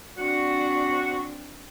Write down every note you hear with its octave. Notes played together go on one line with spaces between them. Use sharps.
C4 D4 F#4